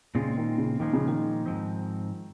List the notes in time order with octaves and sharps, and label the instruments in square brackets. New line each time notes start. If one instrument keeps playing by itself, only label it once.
[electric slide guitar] A#2 G#3 C4 F4 [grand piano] C#3
[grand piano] D#3
C#3
[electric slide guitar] A#2 F3 G#3 [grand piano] D#3
[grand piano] C#3
D#3
[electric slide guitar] G#2 F3 C4 D#4